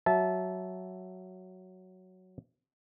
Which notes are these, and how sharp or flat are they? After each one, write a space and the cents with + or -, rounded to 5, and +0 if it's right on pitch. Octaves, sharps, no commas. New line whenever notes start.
F#3 +0 E5 +0 A5 -20